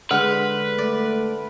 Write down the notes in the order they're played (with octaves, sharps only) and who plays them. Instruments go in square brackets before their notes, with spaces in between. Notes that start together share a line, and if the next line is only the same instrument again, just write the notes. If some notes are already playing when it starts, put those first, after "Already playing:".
[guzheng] D3 [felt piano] G#3 F#5 F6 [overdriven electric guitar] B4
[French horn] A3 [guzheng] D5